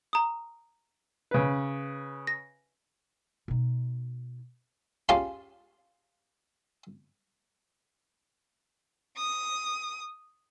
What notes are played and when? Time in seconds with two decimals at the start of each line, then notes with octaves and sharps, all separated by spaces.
0.13 A#5 D#6
1.31 C#3 B4
2.27 A#6
3.48 B2 D#4
5.09 C#4 F4 G4 G#4 F5 A5
9.16 D#6